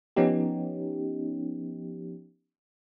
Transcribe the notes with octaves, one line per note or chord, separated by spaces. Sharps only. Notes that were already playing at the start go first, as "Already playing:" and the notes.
F3 B3 C#4 D#4 G4